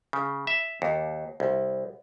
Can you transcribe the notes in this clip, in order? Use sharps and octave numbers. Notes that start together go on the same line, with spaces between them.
C#3
E5
D#2
C2